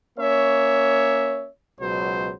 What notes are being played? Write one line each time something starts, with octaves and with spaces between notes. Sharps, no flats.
A#3 C#4 C#5 E5
C#2 B2 F#3 C5